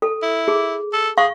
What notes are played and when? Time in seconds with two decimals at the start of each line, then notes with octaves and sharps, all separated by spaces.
0.02 A4
0.23 E4
0.48 G#4
0.93 A4
1.18 G#4 F5 C#6